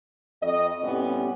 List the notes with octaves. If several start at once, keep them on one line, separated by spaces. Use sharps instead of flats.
F2 D#5
A2 C3 G3 B3 C#4